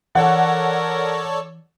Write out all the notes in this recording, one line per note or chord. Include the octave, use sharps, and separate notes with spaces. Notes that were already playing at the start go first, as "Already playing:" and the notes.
E3 A4 A#4 C#5 D5 F#5